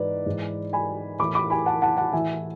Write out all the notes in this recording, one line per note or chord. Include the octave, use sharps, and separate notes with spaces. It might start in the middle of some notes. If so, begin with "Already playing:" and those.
Already playing: G#2 E3 B4 D5
G#2 E3
G#5 B5
A2 E3 B5 D6
B5 D6
G#5 B5
F#5 A5
F#5 A5
F#5 A5
A2 E3 E5 G#5